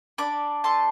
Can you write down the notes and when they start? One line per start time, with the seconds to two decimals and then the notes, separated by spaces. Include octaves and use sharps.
0.18 D4 B5 D6
0.64 A3 A5 C6